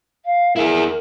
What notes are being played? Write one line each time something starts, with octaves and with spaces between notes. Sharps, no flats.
F5
E4 G#4 A#4